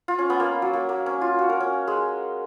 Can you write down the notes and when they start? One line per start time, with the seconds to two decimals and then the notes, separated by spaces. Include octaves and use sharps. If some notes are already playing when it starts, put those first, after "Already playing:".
0.08 F4
0.19 C#4
0.30 B3
0.40 A#3
0.62 F#3
0.73 A#3
0.89 A#3
1.06 C#4
1.21 F4
1.39 F#4
1.49 A#4
1.60 C#4
1.87 G#3